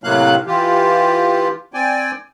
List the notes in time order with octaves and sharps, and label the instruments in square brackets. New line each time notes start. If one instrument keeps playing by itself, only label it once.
[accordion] A2 C3 F#3 A#3 F5 F#6
E3 F4 G4
C4 D5 G5 G#5